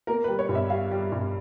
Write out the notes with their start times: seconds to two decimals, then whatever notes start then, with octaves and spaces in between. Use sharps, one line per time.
0.07 A#3 A#4
0.24 B4
0.28 G3
0.39 C#5
0.49 G2
0.55 E5
0.70 G3 F5
0.91 G3
1.12 G2